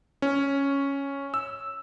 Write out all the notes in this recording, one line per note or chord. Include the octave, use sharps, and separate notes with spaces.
C#4
E6